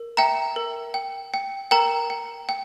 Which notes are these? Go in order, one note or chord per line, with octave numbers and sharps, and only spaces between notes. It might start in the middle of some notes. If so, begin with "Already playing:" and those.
Already playing: A#4
E5 G5 A#5
A#4
G5
G5
A#4 G5 A#5
G5
G5